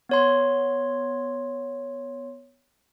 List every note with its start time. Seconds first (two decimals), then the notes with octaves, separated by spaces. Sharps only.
0.09 B3 C#5 C6